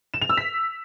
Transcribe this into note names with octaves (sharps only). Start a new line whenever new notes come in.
E7
F7
E6
B6